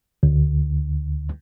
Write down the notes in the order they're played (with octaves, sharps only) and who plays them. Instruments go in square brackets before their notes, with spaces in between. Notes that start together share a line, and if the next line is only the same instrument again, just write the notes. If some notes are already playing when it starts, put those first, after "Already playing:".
[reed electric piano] D2